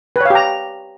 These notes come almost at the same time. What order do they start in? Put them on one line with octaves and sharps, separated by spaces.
B4 C#5 F5 G4 A#5